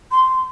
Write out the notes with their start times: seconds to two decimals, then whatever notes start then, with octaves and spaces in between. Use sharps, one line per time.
0.12 C6